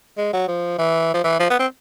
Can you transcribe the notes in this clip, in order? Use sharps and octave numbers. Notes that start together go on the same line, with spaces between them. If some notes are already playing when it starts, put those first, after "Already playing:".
G#3
F#3
F3
E3
F3
E3
F3
B3
C4